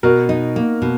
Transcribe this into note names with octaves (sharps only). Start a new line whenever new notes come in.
B2 F#4 A#4
D#4
A#3
B2